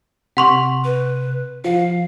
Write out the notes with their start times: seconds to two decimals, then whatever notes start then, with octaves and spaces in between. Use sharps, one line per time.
0.37 C3 F#5 C6 C#6
0.84 B4
1.64 F3 F5